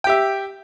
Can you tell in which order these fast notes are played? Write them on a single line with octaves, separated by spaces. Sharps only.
G5 G4 E5